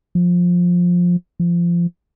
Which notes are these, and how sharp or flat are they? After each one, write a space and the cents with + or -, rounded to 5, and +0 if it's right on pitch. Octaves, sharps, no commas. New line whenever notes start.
F3 +15
F3 -20